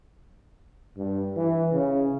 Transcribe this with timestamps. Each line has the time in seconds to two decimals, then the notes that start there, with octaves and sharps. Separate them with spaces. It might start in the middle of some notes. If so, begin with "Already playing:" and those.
0.97 G2
1.36 E3
1.73 C#3